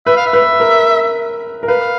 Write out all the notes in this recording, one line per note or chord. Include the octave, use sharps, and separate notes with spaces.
B4 E5
F5
E5
B4
A#4
A#4
B4 F5